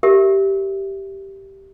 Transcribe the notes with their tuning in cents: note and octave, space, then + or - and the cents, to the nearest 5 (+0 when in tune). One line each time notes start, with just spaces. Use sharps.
G4 -10 A#4 -15 E5 +0